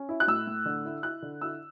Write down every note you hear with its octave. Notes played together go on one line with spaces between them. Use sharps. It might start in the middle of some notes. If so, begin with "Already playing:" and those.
Already playing: C#4
E4
F#6
A2 E6
A2
D3
E4
E4 F#6
D3
E4 E6